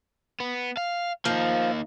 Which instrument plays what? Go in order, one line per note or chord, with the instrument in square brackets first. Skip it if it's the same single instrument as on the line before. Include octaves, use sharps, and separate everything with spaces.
[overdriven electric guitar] B3
F5
[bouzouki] F3 [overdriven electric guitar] A#3 D#4